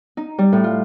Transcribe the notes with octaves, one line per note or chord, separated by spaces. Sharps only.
D#4
G3
A2
F4